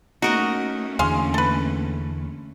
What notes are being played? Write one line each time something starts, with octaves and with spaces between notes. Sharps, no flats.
A3 A#3 C#4 D#4 F#4 A#4 D#5
E2 D3 G#4 F5 C6
A4 B4